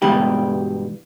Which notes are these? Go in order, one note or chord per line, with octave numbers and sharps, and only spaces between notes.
G2 B2 E3 G3 G#3 G4